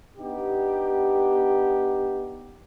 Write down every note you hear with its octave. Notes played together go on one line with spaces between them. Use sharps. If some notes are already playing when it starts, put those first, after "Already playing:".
B3 D4 D#4 G4